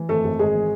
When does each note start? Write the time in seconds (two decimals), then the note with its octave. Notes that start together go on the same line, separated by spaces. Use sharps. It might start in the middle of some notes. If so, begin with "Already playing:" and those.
Already playing: E3
0.09 G#1 A3 A4
0.24 G#1
0.39 G#1 G#3 G#4
0.55 E3